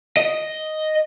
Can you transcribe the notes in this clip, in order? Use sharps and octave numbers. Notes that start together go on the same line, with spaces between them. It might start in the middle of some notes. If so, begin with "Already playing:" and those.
D#5